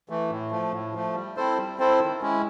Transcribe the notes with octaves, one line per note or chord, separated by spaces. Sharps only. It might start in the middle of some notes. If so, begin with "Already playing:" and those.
E3 A3
A2
F3 A3
A2
F3 A3
G3
C4 E4 A4 C5
G3
C4 E4 A4 C5
D#3
G#3 C#4 E4